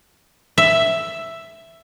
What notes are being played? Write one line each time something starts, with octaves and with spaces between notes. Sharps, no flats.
E5